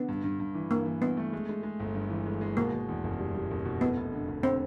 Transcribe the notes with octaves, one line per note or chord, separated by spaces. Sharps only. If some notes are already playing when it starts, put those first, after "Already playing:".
Already playing: D3 B3
G2
G2
G2
E3
G2 A#3
E3
G2 B3
A3
G#3
G#3
G#3
G1
G2
E3
G#3
G#3
B2 A#3
B2
E2
F#1
G3
G3
F#1
B2
F1 B3
F1
D3
F1
D3 C4